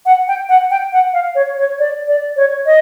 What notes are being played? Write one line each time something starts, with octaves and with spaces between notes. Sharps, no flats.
F#5
G5
F#5
G5
F#5
F5
C#5
C#5
D5
D5
C#5
D#5